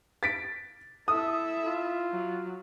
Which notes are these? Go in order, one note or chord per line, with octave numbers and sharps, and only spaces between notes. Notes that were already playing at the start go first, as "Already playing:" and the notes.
A6 B6 D7
E4 A4 E5 D#6
F4
F#3